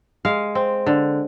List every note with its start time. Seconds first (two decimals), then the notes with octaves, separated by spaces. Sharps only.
0.25 G#3 F5
0.55 C4
0.87 D3